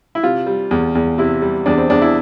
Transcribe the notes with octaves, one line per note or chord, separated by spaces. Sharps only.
E4
C3 F4
G3
E2
E2
C3 E4
G3
E2 D4
C4
E2 D4
E4